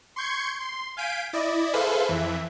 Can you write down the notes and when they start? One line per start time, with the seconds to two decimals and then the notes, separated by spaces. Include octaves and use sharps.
0.16 C6 C#6 G6 G#6 C#7
0.60 C6
0.97 F5 G#5 G6 B6 D7 D#7
1.33 E4 D5 D#5
1.74 G#4 A4 B4 C5 E5 F5
2.08 F2 E3 E5